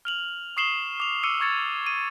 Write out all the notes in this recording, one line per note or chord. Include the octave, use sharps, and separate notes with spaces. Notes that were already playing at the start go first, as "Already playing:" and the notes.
F6 F7 F#7
C#6 D#6 C7 E7 F#7 G7
D6 F7
D6 E6 C#7 D#7 G7
C#6 G#6 A6 C#7
D#7